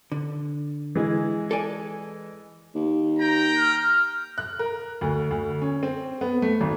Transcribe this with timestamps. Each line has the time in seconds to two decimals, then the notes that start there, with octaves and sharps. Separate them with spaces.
0.12 D3
0.95 E3 G#3
1.51 A4 D5 G#5
2.75 D#2
3.18 G5 A#5
3.58 F6
4.38 F#6
4.59 A#4
5.01 D2
5.31 D2
5.62 C#4
5.83 C4
6.21 B3
6.42 A3
6.61 G#1